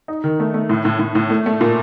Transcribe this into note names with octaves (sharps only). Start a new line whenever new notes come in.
D#4
D#3
A3
A3
A2
A2
A2
A2
A3
A3
A#2